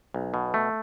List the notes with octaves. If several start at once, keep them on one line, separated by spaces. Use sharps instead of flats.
B1
B2
A3